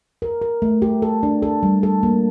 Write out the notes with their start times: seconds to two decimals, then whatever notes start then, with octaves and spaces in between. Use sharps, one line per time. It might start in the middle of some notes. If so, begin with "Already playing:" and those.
0.22 A#4
0.42 A#4
0.62 A3
0.82 G4
1.02 A4
1.23 D4
1.43 A4
1.63 G3
1.83 A4
2.03 A#3